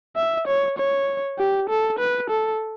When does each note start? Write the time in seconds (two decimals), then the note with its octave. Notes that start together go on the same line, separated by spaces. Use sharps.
0.17 E5
0.47 C#5
0.77 C#5
1.38 G4
1.69 A4
1.99 B4
2.30 A4